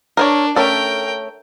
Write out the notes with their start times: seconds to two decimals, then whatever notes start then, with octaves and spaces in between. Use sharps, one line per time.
0.17 D4 A#4 C5 C#5
0.56 A3 C#4 A4 A#4 G5